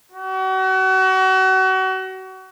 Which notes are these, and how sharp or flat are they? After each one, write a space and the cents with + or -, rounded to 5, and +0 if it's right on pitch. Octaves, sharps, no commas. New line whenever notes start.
F#4 +35